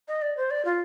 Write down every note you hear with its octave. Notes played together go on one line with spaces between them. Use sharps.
D#5
D5
C5
D5
F4